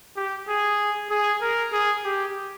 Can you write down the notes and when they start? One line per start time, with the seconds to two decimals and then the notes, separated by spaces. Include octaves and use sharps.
0.17 G4
0.48 G#4
1.10 G#4
1.42 A#4
1.73 G#4
2.04 G4